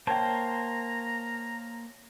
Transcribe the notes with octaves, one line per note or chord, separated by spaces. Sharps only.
A#3 C5 C#5 G5 A5 A#5